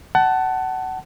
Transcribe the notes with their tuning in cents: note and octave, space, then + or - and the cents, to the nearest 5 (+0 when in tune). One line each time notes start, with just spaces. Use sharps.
F#5 +25 A5 +0